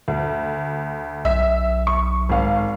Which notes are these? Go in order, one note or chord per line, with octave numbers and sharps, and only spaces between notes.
D2
B1 E5
C#6
G#1 F5